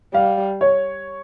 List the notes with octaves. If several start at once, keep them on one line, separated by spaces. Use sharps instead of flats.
G3 F5
C#5